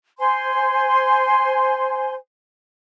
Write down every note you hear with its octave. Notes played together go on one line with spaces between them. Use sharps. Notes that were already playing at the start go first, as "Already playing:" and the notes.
C5 G#5 C6